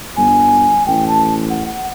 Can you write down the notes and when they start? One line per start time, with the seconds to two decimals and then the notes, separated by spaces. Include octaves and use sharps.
0.16 G1 G#5
0.86 A1 G5
1.07 A5
1.50 F#5